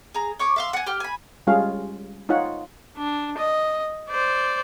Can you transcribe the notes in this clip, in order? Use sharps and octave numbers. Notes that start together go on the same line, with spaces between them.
G#4 A#5
C#5 C#6 D6
E5 F5 C6
F#5 G#5
G4 G5 F6
G#5 B5
G3 G#3 C#4 F4 G#4 F5
D#4 F4 C#5 F#5
D4
D#5
C5 D5